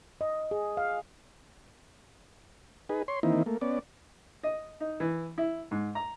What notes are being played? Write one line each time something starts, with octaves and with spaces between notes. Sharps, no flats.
D#5
G#4
F5
D#4 G#4 B4
C#5 C6
D#3 E3 A#3 C4 D#4 E4
A3 A#3
B3 C#4 D5
D#5
D#4
E3
E4
G#2
A#5